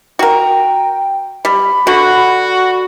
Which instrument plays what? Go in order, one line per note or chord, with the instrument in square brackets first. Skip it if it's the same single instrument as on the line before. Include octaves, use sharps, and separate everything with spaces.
[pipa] F#4 A#4 [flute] G5
[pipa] G3 [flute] B5
[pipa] D3 [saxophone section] F#4